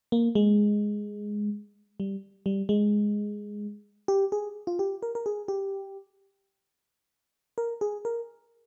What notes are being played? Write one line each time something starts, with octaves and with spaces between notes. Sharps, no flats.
A#3
G#3
G3
G3
G#3
G4
G#4
F4
G4
A#4
A#4
G#4
G4
A#4
G#4
A#4